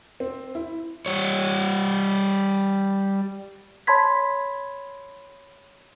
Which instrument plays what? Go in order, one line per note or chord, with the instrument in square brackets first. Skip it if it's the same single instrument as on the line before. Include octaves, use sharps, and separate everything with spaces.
[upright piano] C4
E4
[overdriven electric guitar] G3 C#5
[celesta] C#5 A5 B5 C6 G#6 B6